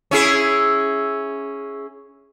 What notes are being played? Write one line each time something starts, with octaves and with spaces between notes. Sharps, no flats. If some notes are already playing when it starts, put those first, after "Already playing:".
C#4 E4 G#4